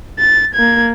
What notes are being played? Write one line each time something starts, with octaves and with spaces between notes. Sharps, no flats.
A6
A#3 G#6